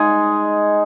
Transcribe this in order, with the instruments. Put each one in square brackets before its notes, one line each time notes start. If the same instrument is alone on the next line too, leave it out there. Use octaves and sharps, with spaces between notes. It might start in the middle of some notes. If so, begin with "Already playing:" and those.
Already playing: [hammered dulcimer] G#3 D#4 G#4